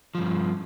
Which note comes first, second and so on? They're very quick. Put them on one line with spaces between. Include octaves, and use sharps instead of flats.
F3 E2 G2